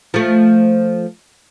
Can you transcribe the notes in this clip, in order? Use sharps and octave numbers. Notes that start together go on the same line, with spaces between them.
F3 A3